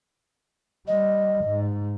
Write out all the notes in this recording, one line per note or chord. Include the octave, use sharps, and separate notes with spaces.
G3 D#5
G#2